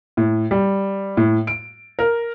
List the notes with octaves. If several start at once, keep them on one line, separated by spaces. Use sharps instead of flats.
A2
G3
A2
D7
A#4